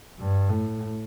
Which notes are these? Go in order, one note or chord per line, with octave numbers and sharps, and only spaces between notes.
G2
A2